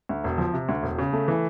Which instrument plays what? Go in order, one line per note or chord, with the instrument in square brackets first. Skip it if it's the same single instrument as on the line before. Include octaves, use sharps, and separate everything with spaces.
[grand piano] D2
E1
F3
C3
D2
E1
C#3
A3
E3